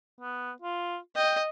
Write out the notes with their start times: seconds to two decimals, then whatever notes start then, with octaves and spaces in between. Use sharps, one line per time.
0.21 B3
0.62 F4
1.16 D#5 G5